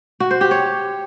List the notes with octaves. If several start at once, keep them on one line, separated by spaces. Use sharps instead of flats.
F#4
C5
G4
C#5